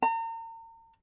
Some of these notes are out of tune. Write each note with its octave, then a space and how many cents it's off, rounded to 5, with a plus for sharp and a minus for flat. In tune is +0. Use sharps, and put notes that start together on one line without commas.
A#5 -40